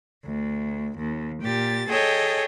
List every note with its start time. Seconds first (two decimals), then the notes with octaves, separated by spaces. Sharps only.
0.25 D2
0.96 D#2
1.41 A#2 G4 A6
1.88 G#4 A4 C#5 D#5 G5